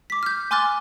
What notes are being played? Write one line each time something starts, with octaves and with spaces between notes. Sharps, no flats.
D6 B6
F6 G6
G#5 C6 D6 F6 F#6 A6